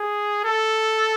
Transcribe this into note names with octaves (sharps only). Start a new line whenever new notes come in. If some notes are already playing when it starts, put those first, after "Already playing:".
Already playing: G#4
A4